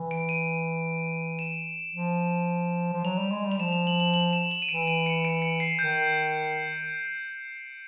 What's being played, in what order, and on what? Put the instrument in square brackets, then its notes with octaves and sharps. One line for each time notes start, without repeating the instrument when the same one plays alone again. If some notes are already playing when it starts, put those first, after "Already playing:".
Already playing: [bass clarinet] E3
[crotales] D7
D#7
E7
[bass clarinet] F3
F3
[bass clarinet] F#3 [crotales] F7
[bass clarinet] G3
G#3
G3
[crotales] F7
[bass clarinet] F3 [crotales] E7
[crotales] F7
F#7
F#7
F#7
E7
F#7
D#7
[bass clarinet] E3 [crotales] D7
[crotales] D#7
C#7
D7
C#7
C7
[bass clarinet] D#3 [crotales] G6